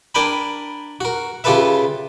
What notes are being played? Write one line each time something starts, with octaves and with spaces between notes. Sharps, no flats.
D4 A#4 G5 G#5 B5
F#4 A#4
C#3 F4 G4 A4 B4 E5